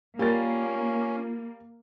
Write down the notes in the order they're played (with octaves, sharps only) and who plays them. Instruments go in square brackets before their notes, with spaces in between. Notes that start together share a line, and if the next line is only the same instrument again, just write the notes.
[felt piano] G3 A6 [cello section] A#3 [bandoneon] C#4 [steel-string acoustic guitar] F4 A#4